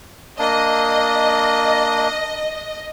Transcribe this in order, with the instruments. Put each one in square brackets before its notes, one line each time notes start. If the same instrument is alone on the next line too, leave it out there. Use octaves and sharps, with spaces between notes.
[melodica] A#3 D4 [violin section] D#5